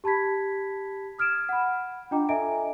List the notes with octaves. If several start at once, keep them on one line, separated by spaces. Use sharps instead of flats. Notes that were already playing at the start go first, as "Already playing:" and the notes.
G4 A5 B5 G#6 B6
D#6 F6 G#6 D7 E7
F#5 B5
D4 F4 D#5 G5 A#5 D6
A4 D#5 E5 G#5 A#5 D7